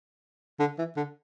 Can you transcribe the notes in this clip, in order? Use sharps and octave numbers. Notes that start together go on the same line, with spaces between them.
D3
E3
D3